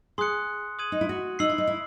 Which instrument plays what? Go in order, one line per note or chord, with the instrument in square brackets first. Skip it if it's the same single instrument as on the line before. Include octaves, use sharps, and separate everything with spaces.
[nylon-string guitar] G#4 [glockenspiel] C6 D#6 F#6 C#7
[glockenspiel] D#6 G#6 D#7 F#7
[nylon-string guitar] D#4
E4
F#4
[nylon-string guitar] D#4 [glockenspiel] E6 C7 F#7
[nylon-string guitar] E4
D#4
E4